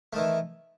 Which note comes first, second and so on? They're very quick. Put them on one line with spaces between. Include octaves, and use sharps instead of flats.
A3 D#3 E3